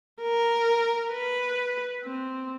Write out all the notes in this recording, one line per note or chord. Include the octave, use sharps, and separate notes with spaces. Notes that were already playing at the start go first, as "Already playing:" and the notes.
A#4
B4
C4